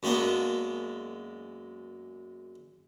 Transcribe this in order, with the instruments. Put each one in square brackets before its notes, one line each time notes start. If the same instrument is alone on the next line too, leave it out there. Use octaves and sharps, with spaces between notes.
[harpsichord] F#2 G#3 A#3 B3 D4